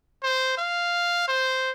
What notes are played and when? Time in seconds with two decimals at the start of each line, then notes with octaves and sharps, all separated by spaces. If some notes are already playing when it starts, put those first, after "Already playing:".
0.23 C5
0.57 F5
1.28 C5